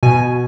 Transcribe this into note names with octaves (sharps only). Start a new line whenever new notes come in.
B2 G#5